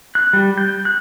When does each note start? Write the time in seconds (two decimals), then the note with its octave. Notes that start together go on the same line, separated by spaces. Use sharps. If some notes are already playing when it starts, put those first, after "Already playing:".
0.15 F#6
0.33 G3
0.58 G6
0.85 F#6